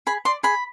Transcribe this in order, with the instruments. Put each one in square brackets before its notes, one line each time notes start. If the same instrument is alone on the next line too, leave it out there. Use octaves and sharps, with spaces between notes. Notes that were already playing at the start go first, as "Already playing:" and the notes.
[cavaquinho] G#4 B5
D5 C6
G#4 B5